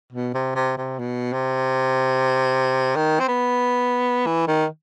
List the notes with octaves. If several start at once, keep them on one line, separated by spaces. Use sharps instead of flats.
B2
C3
C3
C3
B2
C3
D#3
C4
B3
E3
D#3